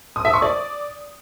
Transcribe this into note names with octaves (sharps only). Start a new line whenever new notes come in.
D#6
E5
C#6
D5